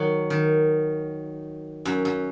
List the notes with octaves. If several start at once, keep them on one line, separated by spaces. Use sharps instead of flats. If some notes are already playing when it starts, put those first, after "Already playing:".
Already playing: D#3 F#3
D#3
F#2
F#2